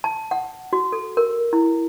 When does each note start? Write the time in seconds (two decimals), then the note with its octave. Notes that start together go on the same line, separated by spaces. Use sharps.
0.04 A5
0.31 F#5
0.73 F#4
0.92 A4
1.17 A#4
1.53 E4